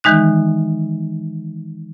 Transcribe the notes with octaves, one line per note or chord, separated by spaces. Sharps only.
D#3 E3 G#3 D#4 F#6